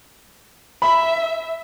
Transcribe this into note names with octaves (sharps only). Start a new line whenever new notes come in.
E5 B5